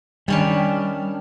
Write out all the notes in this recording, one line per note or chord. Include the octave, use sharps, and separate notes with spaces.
D#3 G3 C#4 D4